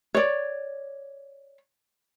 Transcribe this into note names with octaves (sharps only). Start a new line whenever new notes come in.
C#5 D5